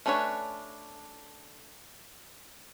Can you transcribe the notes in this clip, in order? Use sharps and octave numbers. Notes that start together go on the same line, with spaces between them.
A3 C#4 D4 B4 C#5